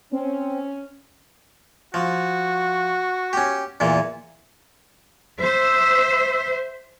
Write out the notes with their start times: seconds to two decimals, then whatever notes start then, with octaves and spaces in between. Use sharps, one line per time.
0.12 C4 C#4
1.94 F3 F#4
3.33 C#4 G4
3.80 E2 A#2 E3
5.41 C5 E5 E6